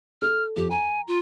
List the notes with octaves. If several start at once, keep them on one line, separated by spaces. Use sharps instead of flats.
A4 F6
F2 G4
G#5 A#5
F4